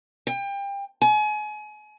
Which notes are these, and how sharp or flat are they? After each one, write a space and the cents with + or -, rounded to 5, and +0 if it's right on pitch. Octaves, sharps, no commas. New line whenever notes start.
G5 +30
G#5 +35